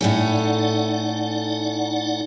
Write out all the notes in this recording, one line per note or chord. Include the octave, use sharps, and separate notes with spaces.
A2 A3 C#4 D#4 D5 F#5